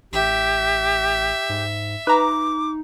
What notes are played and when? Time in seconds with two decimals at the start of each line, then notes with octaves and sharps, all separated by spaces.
0.13 A1 G4 E5
1.50 G#2
2.07 D#4 B4 A#5 D6